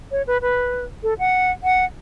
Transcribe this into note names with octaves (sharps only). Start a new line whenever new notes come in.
C#5
B4
B4
A4
F#5
F#5